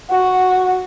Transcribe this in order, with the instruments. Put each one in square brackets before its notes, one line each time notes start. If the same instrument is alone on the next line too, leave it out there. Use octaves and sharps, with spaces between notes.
[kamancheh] F#4